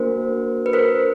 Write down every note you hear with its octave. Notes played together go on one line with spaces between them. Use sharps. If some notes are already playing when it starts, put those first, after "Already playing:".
Already playing: A#3 D4 F#4 A#4 C5
B4
A#4 C5